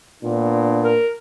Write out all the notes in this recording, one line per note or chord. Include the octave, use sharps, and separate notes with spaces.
A#2 B3 D4
A#4